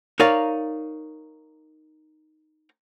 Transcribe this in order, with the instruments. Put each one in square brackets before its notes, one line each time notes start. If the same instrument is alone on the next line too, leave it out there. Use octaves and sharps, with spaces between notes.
[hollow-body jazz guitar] D#4 A#4 C#5 D5 F5